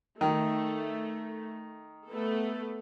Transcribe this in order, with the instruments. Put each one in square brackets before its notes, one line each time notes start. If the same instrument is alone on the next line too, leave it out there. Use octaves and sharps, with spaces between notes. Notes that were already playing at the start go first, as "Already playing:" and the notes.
[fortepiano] D#3 [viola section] A3
[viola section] A3 B3 A4